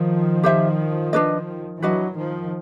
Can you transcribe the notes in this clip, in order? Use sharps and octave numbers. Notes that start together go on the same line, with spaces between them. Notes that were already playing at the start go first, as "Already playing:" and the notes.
Already playing: D#3 F3
G4 C5 E5
D4 F#4 B4 D#5
E3 F#3 D4 F#4 B4 D#5
D#3 F3